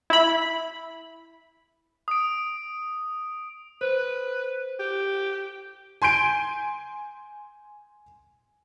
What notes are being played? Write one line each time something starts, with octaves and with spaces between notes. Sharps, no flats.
E4 B5
D#6 D7
B4 C5
G4
G#5 C6 G6 D7